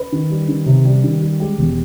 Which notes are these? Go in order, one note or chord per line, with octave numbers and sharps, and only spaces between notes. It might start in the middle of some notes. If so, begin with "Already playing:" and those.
Already playing: B4
D#3
G3
D#3
C3
G3
D#3
G3
G#3 G4
E1